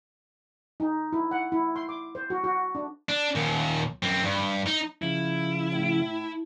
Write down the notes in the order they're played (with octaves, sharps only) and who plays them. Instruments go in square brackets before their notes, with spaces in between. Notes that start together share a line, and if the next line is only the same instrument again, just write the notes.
[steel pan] D#4
E4
F#5
E4
C6
D6
C5
F#4
F#4
D4
[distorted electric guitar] D4
D#2 A#2
F#2 C4
G2
D#4
[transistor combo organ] C#3 F3 [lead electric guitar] E4
[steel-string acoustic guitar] A2